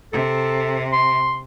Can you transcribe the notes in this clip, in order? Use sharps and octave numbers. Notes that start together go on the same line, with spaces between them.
C3 A4
C6